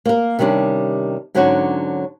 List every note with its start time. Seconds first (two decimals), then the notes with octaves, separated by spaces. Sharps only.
0.05 A#3 A#4
0.39 C3 D#3 G3 C#4 D4
1.35 G#2 D3 F#3 C#4 D4 F#4